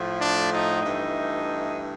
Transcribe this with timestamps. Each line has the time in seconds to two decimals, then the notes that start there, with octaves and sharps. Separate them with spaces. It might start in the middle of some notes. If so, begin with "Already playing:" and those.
Already playing: A2 F3 A3
0.20 D4
0.51 D#4
0.82 G2 E3 A3 D#4